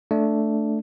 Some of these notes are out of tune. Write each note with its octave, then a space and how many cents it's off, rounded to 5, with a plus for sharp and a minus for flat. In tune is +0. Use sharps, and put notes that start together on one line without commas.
A3 +0 D4 +0